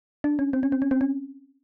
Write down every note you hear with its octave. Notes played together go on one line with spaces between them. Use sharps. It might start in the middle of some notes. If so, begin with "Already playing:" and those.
D4
C#4
C4
C#4
C4
C#4
C4
C#4